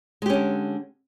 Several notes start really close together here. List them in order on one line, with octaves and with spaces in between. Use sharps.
G#3 G4 C#4 D3